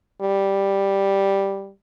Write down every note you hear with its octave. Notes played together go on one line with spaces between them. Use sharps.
G3